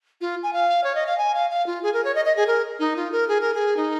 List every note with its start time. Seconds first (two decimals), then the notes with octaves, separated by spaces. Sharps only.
0.21 F4
0.43 G#5
0.53 F5
0.83 C#5
0.95 D#5
1.06 F5
1.18 G#5
1.34 F5
1.50 F5
1.66 F4
1.83 G#4
1.93 A#4
2.04 C#5
2.15 D#5
2.25 D#5
2.36 G#4
2.47 A#4
2.79 D#4
2.96 F4
3.11 A#4
3.28 G#4
3.40 A#4
3.54 G#4
3.76 D#4